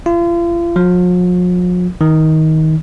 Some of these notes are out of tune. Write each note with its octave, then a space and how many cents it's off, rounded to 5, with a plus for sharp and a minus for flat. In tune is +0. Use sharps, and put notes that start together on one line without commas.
F4 -40
F3 +45
D#3 +20